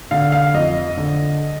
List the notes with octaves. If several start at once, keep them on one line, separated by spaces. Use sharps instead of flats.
D3 F5
F5
F2 D#5
D3